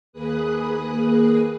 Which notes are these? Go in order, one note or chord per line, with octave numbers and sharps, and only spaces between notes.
D#2 A#3 G#4 B4 D#6 F#6